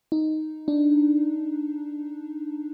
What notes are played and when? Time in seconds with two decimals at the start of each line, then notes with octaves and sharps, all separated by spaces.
0.12 D#4
0.68 D4